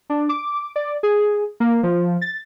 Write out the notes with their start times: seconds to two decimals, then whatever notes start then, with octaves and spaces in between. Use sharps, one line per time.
0.10 D4
0.29 D6
0.76 D5
1.03 G#4
1.60 A#3
1.83 F3
2.21 A6